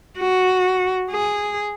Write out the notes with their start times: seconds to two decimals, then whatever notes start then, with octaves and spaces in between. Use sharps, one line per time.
0.19 F#4
1.11 G#4